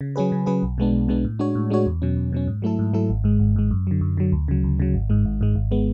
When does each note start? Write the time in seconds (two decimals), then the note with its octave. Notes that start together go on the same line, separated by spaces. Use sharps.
0.01 C#3
0.16 F#3 C#4 G#4 B4
0.32 C#3
0.46 F#3 C#4 G#4 B4
0.63 B1
0.78 B2 G#3 B3 D4
0.93 B1
1.08 B2 G#3 B3 D4
1.25 A2
1.39 G#3 D4 F#4 C#5
1.55 A2
1.70 G#3 D4 F#4 C#5
1.86 E2
2.02 B2 F#3 C#4
2.17 E2
2.32 B2 F#3 C#4
2.47 G#2
2.62 F#3 A3 E4 A4
2.79 G#2
2.93 F#3 A3 E4 A4
3.09 G#1
3.24 G#2 G#3
3.39 G#1
3.56 G#2 G#3
3.71 F#2
3.87 D3 F#3
4.01 F#2
4.17 D3 F#3
4.32 D2
4.48 C#3 F#3
4.64 D2
4.79 C#3 F#3
4.94 G#1
5.10 G#2 G#3
5.25 G#1
5.41 G#2 G#3
5.55 G#1
5.71 G#3 B3